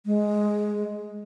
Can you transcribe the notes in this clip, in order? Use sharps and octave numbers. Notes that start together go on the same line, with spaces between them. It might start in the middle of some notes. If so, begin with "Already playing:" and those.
G#3